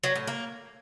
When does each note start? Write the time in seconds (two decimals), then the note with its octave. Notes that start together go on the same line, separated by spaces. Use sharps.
0.04 F#3
0.15 A2
0.27 A#3